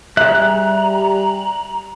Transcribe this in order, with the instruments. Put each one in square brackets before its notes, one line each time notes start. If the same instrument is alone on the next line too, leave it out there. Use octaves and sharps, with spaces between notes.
[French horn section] G3 [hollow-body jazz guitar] G#4 E5 [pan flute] A#5 [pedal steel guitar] F#6